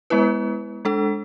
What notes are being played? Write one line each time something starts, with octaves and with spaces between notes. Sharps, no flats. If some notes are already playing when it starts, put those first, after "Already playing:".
G#3 B3 E4 B4
G#3 D4 A4